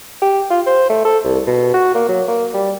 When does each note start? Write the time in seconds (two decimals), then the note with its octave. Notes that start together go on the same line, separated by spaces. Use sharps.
0.21 G4
0.50 F4
0.66 C5
0.89 A3
1.05 A4
1.24 C2
1.47 B2
1.74 F#4
1.95 A#3
2.09 F#3
2.28 A#3
2.54 G3